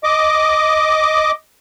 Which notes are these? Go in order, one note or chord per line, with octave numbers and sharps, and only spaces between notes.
D#5 D6